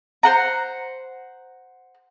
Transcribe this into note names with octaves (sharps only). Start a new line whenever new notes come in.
C5 F#5 A#5